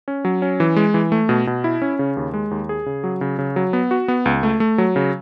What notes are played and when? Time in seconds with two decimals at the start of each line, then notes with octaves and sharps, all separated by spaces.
0.08 C#4
0.25 F#3
0.42 C#4
0.60 E3
0.76 G#3
0.94 E3
1.12 A3
1.29 B2
1.47 B2
1.64 E4
1.82 C#4
1.99 C#3
2.17 D#2
2.34 G#3
2.51 D#2
2.69 G#4
2.86 C#3
3.04 F#3
3.21 C#3
3.39 C#3
3.56 F#3
3.73 B3
3.91 F#4
4.08 B3
4.26 C#2
4.43 A3
4.60 A3
4.78 F#3
4.96 C#3